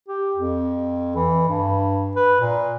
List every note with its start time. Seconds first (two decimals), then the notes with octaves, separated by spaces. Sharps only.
0.08 G4
0.36 F2
1.15 E3
1.48 G2
2.16 B4
2.41 A#2